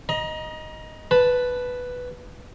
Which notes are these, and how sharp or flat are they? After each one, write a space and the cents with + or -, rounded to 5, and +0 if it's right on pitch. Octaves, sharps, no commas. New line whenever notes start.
D#5 +0 A#5 +30
B4 +0 A5 +0